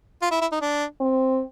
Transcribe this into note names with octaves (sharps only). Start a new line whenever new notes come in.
F4
E4
E4
D#4
D4
C4